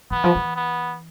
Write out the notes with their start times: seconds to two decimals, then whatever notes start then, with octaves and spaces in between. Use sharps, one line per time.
0.11 E3 B3
0.24 F3
0.35 E3
0.56 B3